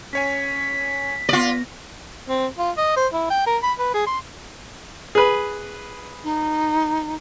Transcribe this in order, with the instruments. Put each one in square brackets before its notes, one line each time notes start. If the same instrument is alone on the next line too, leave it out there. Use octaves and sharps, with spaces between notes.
[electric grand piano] C#4 C#5 G#5 [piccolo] B6
[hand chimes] B3 A#6 [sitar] F4 D5
[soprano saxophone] C4
F4
D#5
C5
E4
G5
A#4
B5
B4
G#4
C6
[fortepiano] G#4 B4
[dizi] D#4